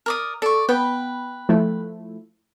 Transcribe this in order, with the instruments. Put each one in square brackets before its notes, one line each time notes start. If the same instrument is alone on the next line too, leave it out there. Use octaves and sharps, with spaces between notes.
[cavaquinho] A#4 D5 D#6
[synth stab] A4 [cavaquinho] D5 C#6
[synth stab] B3 [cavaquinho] B4 G5 B5
[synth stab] F3 A3 E4